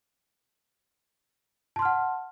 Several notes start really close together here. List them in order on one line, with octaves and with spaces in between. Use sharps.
A5 C6 F6 F#5